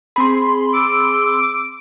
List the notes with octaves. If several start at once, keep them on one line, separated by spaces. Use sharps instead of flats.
C4 G#4 B5 C6
D6 E6